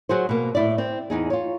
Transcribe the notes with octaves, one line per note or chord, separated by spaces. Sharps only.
F#3 F#4 G#4 C5
B2 A#3
A2 E4 D5
C4
E2 D#4 G#4
F4 C#5